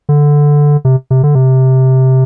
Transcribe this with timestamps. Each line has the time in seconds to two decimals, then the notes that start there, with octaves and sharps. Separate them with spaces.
0.09 D3
0.85 C3
1.11 C3
1.23 D3
1.35 C3